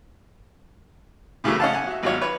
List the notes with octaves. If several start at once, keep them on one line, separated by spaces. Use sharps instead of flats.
A2 C#3 E3 F#3 A3 A#3
C#4 D#5 F5 F#5 A5
F#5 G#5
F#4 E5
G#1 F#3 F4 C#5
B4 C#5